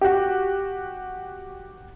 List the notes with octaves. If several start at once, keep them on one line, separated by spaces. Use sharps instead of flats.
F#4 G4